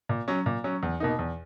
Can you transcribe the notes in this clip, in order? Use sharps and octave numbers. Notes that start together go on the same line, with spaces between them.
A#2
F#3 C#4
A#2
F#3 C#4
E2
B2 A#3 D#4
E2